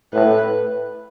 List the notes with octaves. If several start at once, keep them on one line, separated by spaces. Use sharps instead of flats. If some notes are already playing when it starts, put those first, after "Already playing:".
A2 B4